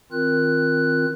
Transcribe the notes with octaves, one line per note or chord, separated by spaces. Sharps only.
D#3 C4 F4 A#4 F#6